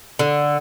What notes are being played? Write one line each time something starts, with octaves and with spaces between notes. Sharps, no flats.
D3